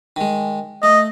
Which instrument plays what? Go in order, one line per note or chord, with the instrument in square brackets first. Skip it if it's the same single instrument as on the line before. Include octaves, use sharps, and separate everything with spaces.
[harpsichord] D#3 G#3
[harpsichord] A3 [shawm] D#5